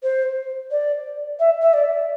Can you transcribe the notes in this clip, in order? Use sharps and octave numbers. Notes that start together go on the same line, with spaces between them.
C5
D5
E5
E5
D5